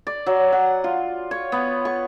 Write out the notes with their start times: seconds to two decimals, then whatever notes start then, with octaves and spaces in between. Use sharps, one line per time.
0.07 D5
0.26 F#3
0.52 F#5
0.84 F4
1.31 C#5
1.52 B3
1.85 C#6